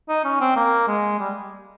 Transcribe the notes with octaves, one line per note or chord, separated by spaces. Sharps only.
D#4
C#4
C4
A#3
G#3
G3